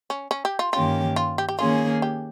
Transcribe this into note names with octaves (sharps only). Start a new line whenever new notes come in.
C#4
C#4
G4
F4
G2 D#3 A#3 C#4 F4 G4
F4
G4
G4
D#3 A#3 C#4 F4 G#4
G4